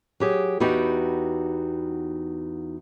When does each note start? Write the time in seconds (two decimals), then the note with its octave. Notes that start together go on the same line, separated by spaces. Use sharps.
0.20 F#3 G4 G#4
0.60 E2 B3 D#4 F#4 G4 G5